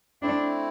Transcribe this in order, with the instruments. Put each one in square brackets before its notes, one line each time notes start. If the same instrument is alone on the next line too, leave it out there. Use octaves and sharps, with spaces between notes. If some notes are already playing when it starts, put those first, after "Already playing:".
[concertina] A3 C4 E4 [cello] D4